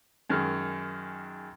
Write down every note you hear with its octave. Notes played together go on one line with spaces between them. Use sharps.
F#2 D#3 G#3 F6